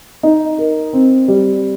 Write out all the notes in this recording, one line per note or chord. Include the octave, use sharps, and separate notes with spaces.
D#4
A#4
C4
G3